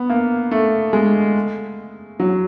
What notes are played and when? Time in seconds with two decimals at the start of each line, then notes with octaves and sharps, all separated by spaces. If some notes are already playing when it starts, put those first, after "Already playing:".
Already playing: B3
0.10 A#3
0.51 A3
0.93 G#3
2.20 F#3